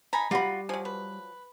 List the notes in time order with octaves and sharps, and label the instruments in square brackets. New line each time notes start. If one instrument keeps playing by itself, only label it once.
[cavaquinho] D#4 G#5 B5 [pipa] A#5
[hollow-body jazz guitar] G3 B5 [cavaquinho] F4 F#4
[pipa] F3 F#3 [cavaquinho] G#5
[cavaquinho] B4